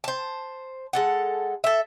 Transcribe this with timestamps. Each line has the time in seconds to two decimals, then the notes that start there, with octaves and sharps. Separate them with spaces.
0.04 C5 A5
0.93 G#3 A4 F#5
1.64 A4 E5